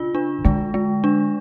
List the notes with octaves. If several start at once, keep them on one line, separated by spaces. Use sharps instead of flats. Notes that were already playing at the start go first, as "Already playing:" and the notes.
Already playing: C#3 D4 F4
D4
D3 G#3
G#3
D4